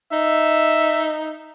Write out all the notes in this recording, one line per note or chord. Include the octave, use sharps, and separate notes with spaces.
D#4 E5